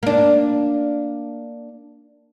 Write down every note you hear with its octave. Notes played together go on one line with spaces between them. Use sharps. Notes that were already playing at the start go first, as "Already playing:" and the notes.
A#3 D4